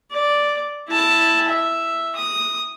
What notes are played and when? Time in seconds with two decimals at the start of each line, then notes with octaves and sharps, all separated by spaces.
0.12 D5
0.88 E4 A5
1.49 E5
2.16 D#6